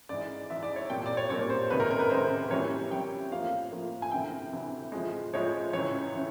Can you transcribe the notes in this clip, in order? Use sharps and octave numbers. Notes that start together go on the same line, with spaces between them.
G#2 E3 G#3 D5
G#2 E3 G#3 E5
D5
C#5
C2 A#2 G3 A#3 G5
D5
C#5
C2 A#2 G3 A#3 C#5
C5
C#2 C3 D#3 G#3 B4
A#4
A#4
B4
C#2 C3 D#3 G#3 C5
F2 C#3 E3 G3 A#3 C#5
F2 C#3 E3 G3 A#3 G5
A2 F3 A#3 F5
A2 F3 A#3
G#5
D2 C3 E3 G5
D2 C3 E3
A2 F3 G#3
A2 F3 G#3 C#5
C#2 C#3 E3 C#5
C#3 E3